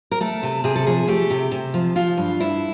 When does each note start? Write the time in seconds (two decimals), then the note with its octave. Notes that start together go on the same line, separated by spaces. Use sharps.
0.11 A#4
0.21 A3 A4
0.43 C3
0.64 C3 G#4
0.76 A4
0.87 F3 G#4
1.08 A3 G4
1.30 C3
1.51 C3
1.74 F3
1.96 F3 F4
2.17 G2
2.40 G2 E4